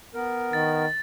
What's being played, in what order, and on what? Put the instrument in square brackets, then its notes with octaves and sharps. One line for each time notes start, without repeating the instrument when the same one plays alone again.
[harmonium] B3 A#4
[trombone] D#3 [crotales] A6